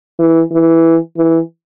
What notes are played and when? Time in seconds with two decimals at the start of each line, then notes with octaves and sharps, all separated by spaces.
0.19 E3
0.52 E3
1.17 E3